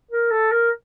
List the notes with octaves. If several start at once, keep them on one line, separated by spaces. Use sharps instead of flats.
A#4
A4
A#4